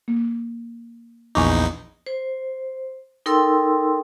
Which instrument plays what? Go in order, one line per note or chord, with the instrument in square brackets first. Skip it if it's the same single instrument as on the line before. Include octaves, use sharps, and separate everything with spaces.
[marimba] A#3
[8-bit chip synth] A#1 E2 D#4 [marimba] G#5 C#6 D6
[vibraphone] C5
D#4 A4 A#4 G5 C6 E6